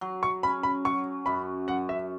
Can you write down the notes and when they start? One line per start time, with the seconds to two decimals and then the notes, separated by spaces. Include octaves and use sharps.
0.01 F#3
0.23 C#6
0.43 C#4 B5
0.63 B5
0.85 F#3 C#6
1.26 F#2 B5
1.68 F#2 F#5
1.89 E5